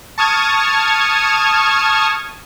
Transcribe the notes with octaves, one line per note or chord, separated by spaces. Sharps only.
A5 C#6 D#6 F6 G#6